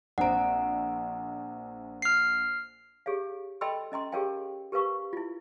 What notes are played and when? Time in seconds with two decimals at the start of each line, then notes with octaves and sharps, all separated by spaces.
0.18 A#1 C4 F#5 A#5 D7
2.02 F6 C7
3.06 G4 G#4 C#5 F5
3.61 A4 D#5 G5 B5 C6 E6
3.92 C#4 D#5 A#5 C6
4.12 G4 G#4 A#4 C#5 F5 G5
4.72 G4 A#4 B4 F5 C#6
5.13 E4 F4